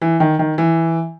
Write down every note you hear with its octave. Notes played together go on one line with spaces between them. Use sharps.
E3
D#3
D#3
E3